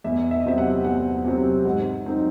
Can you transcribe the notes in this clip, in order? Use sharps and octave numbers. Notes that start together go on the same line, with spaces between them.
E2 E5
E5
D#5
C3 F#3 C4 E5
F#5
E2 F#5
C3 F#3 C4
G#2 F#5
F#3 C4 D#4